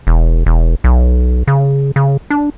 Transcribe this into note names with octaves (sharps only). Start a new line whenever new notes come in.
E1
E1
B1
C#3
C#3
D4